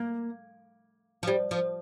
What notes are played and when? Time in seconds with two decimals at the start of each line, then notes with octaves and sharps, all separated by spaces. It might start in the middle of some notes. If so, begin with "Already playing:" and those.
Already playing: A#3
1.23 F3
1.27 G3
1.51 F3